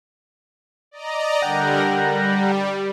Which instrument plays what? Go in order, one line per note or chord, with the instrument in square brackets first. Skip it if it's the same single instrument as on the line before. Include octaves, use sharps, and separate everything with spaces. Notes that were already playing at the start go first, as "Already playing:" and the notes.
[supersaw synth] D5 D#5 A#5
[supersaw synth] D3 G3 A#4 [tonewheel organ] F#5 G5 A#5
[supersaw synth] G3